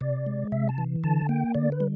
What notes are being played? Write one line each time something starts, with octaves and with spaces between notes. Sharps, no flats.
C3 D5
G#3
C3 E5
A5
E3
D3 A5
A#3 G5
D3 D5
B4
G3